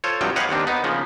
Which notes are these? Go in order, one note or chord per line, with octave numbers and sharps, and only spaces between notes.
F4 A4 C5 C#5
G2 C3 F3 F#3 G5
G4 B4 C#5 D#5 F5 F#5
D#2 D#3 C4 D4
B3 D#4
C#3 F3 A#3